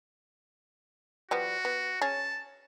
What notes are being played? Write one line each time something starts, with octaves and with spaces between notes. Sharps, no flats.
F3 G3 B3 F#4
B3
C#4 G#4 A5